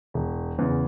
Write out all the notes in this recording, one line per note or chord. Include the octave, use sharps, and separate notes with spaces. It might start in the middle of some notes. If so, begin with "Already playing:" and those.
E1
E2 C#3